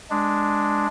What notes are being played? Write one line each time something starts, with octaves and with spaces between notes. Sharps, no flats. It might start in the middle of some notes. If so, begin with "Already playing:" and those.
G#3 D4